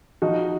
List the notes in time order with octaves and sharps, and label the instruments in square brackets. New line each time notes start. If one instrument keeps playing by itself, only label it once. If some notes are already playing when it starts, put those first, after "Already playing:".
[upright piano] F3 D#4 F#4